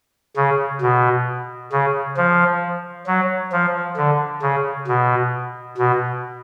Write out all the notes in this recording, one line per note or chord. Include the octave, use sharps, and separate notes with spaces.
C#3
B2
C#3
F3
F#3
F3
D3
C#3
B2
B2